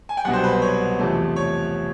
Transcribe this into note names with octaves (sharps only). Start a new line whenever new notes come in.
G#5
G5
C2 B2 F#3 F#5
C5
B4
C5
C#5
E2 C3 F3 A3
C#5